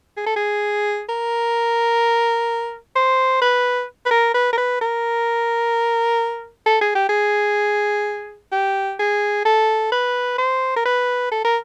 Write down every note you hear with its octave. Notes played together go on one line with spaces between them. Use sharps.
G#4
A4
G#4
A#4
C5
B4
B4
A#4
B4
A#4
B4
A#4
A4
G#4
G4
G#4
G4
G#4
A4
B4
C5
A#4
B4
A4
A#4